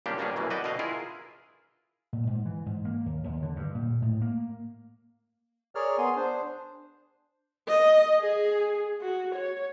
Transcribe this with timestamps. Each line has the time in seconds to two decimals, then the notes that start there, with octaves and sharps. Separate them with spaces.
0.06 A#2 C#3 G3 A#3 D4 G4
0.18 B2 G3 A#3 C#4 D4 G#4
0.36 F#2 B2 E3 A#3
0.50 F#4 B4 D5 D#5 G5
0.64 B2 D3 D#5 F5
0.79 E4 F4 G#4 A#4
2.13 A#2
2.27 G#2
2.45 E3
2.66 G#2
2.85 A#3
3.06 D#2
3.24 D#2
3.42 D3
3.56 G2
3.75 A#2
4.02 A2
4.21 A#3
5.75 G#4 A#4 C#5 D5 F6
5.98 B3 G#4 G#5 C6
6.16 D4 C5
7.68 D#5
8.20 G#4
9.01 F#4
9.35 C#5